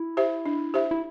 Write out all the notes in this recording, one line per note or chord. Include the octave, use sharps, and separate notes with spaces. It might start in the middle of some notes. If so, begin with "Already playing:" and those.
Already playing: E4
G4 C5 E5
D4
G4 C5 E5
E4